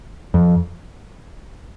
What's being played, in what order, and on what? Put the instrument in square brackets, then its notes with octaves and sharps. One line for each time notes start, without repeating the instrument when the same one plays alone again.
[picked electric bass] F2